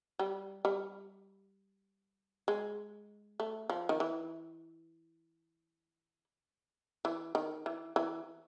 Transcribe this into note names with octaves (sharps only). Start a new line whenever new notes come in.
G3
G3
G#3
A3
F3
D#3
E3
E3
D#3
E3
E3